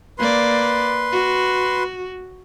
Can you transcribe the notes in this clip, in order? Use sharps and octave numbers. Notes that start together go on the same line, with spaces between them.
A#3 B4 D5 C6
F#4